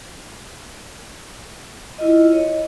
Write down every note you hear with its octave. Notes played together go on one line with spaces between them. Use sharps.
E4 F4 D#5
C#5 D#5